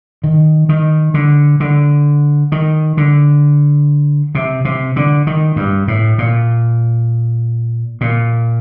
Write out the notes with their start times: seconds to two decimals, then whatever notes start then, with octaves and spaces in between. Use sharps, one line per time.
0.24 D#3
0.69 D#3
1.14 D3
1.60 D3
2.52 D#3
2.97 D3
4.35 C3
4.65 C3
4.96 D3
5.27 D#3
5.56 G2
5.88 A2
6.18 A#2
8.01 A#2